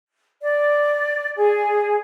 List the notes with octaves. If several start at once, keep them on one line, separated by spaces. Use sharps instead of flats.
D5
G#4